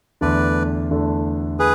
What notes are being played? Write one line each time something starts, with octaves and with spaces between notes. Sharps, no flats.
E2 D3 A3 B4 D5
E2 D3 A3
G#4 B4